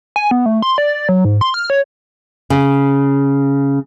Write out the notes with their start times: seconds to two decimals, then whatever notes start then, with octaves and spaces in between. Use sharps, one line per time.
0.16 G#5
0.31 B3
0.46 A3
0.62 C6
0.78 D5
1.09 F#3
1.25 G#2
1.41 C6
1.54 F6
1.70 C#5
2.50 C#3